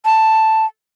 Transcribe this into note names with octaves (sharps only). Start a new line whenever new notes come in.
A5